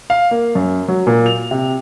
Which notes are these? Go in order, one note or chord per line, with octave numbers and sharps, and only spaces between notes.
F5
A#3
F#2
F#3
A#2
F7
C3